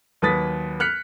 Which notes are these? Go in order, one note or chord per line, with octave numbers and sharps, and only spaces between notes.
D#2 F#3 B4 D#6 A6 B6
F6 F#6 B6 C#7